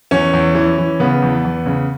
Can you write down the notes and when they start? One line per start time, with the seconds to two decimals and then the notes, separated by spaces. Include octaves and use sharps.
0.11 E2 C#4
0.33 E2
0.55 E3
0.78 E3
1.00 C#3 B3
1.22 E2
1.44 E2
1.66 C#3